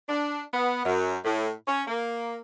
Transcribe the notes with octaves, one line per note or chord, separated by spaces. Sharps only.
D4
B3
F#2
A2
C#4
A#3